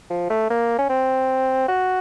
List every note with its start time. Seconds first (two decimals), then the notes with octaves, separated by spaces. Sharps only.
0.10 F3
0.30 A3
0.50 A#3
0.79 C#4
0.90 C4
1.68 F#4